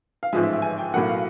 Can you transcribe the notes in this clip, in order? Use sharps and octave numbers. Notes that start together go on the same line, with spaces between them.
F5
A1 G#2 F3 G#3 E5
E5
E5
G#5
G5
B1 A2 F#3 A#3 F#5
F5